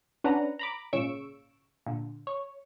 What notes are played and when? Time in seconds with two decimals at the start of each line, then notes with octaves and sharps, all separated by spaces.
0.24 C#4 D4 B4 F#5 A#5
0.59 A#5 B5 D6
0.93 G#1 A#2 C#3 C#6 E6 D7
1.87 A#2 D3
2.27 C#5